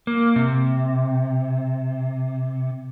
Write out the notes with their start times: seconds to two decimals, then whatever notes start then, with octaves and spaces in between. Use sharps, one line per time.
0.07 A#3
0.36 C3